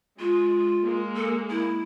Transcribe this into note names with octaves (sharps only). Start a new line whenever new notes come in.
G#3 F4
G#3 A#3
A4
E4